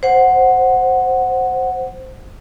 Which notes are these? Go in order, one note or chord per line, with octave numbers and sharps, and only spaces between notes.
C5 F#5